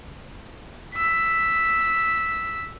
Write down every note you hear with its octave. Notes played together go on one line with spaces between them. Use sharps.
E6 B6